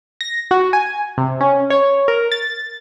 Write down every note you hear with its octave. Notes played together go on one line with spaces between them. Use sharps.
A#6
F#4
G#5
C3
C#4
C#5
A#4
A6